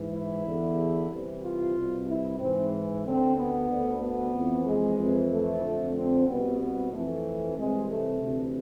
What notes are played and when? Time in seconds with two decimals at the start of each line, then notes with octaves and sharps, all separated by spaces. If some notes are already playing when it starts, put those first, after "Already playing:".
Already playing: G#2 E3
0.13 E4
0.46 E2 D3
1.10 C2 C3 E3
1.43 F4
1.75 C2 B2
2.08 E4
2.40 G#2 E3 C4
3.04 D2 D3 C4
3.37 B3
3.69 D2 D3
4.02 B3
4.33 F2 E3
4.66 G#3
4.99 F2 E3
5.31 A3
5.63 F2 D3
5.96 C4
6.28 C2 B2 B3
6.60 B3
6.92 F2 E3 A3
7.57 C2 C3 E3 G#3
7.90 A3
8.22 D2 C3 E3